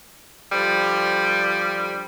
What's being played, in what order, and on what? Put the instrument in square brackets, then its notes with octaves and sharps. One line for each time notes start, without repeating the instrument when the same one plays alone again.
[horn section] D3 F3 G3